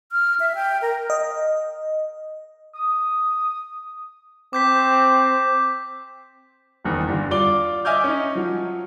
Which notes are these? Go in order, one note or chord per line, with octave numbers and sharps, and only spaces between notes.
F6
E5
G5
A#4
D#5
D#6
C4 D6 G6 B6
F#1 E2 D#3
G2 D3
F4 D5 D6 G7
D#5 E5 G#5 D6 F6 G6
C#4 D#4
F3 F#3